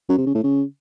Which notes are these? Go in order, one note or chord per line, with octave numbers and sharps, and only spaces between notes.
F#2
C3
C#3
A2
C#3